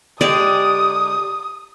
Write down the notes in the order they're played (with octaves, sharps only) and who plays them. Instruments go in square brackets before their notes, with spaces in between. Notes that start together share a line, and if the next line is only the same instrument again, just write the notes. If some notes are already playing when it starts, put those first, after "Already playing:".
[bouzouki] D3 G#3 G4 [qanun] D5 [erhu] D#6